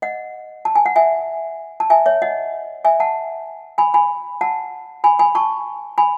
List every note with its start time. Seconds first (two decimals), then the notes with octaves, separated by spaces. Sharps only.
0.02 D#5 F#5
0.65 A5
0.75 G#5
0.86 F#5
0.96 E5 G#5
1.80 A5
1.90 E5 G#5
2.06 C#5 E5
2.22 D#5 F#5
2.85 E5 G#5
3.00 F#5 A5
3.78 G#5 B5
3.94 G#5 B5
4.41 F#5 A5
5.04 G#5 B5
5.19 G#5 B5
5.35 A5 C#6
5.98 G#5 B5